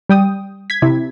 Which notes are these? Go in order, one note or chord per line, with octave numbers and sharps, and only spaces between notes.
G3 G5 D#6
G#6 B6
C3 E4